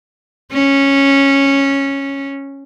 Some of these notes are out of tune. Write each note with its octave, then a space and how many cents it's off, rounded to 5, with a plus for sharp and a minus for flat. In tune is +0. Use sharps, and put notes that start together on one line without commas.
C#4 -10